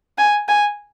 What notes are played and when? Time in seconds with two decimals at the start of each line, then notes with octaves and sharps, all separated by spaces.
0.18 G#5
0.48 G#5